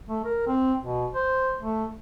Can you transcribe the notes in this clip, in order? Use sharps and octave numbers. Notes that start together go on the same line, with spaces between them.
A3
A#4
C4
B2
C5
A3